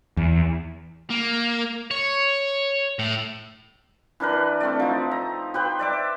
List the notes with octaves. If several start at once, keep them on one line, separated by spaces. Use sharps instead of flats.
E2
A#3
C#5
A2
E3 D4 A#4 B4
A3 C4 A4 D5
F3 D#4
A#5
G4 B4 C5 G5
D5 E5 D6